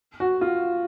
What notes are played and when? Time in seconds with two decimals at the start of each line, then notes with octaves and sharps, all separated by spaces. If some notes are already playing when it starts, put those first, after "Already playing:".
0.20 F#4
0.41 F4